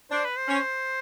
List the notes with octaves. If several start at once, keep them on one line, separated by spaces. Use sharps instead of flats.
D4 C5
B4
C5
C#4